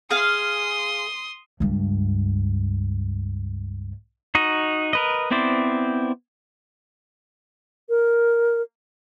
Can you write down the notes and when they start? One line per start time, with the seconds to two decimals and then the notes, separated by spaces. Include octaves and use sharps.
0.11 G#4 F5 C6 D#6
1.60 C#2 G2
4.35 D#4 F#4 D#5
4.93 A#4 B4 D#5
5.31 B3 C4 E4 C5 D5
7.89 A#4